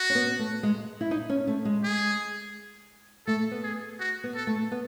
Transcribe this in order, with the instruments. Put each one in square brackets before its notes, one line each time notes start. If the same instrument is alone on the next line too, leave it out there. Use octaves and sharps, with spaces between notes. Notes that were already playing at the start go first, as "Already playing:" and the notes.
Already playing: [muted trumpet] F#4
[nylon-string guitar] C#4
B3
A3
G#3
E4
D#4
C#4
A3
G#3
[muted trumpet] G#4
[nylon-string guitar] A3 [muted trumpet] A4
[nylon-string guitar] B3
[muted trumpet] G#4
F#4
[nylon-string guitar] B3
[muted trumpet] A4
[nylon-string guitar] A3
B3